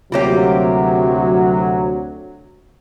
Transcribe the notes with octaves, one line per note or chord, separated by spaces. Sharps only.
D2 C3 F#3 G3 A#3 F4 G4 C#5